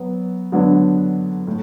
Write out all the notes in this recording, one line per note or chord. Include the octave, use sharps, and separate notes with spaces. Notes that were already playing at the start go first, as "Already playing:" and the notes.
Already playing: F#3 B3
D3 F#3 B3 D4
A2